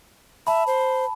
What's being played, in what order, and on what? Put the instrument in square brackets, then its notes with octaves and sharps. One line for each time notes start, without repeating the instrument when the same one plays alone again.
[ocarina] E5 [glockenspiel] A5 B5
[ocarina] C5